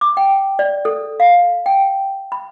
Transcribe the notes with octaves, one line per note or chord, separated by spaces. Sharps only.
D6
G5
D5
A4
F5
G5
B5